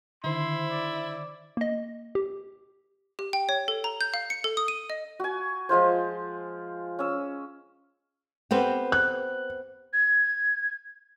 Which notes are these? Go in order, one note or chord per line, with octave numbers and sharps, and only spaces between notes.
D3 D#3 E4 C5 C6
D5
A#3 D#5
G4
G4
G5
C#5
A4
A#5
G6
F5
C#7
A4
D#6
D#7
D#5
F#4 G#5
F3 G#3 F4 C5
C#4 E6
B3 C4 G4 A4 B4
F#6
G#6